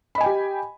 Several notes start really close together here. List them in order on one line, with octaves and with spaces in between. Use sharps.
B5 D#5 G#5 G5 G4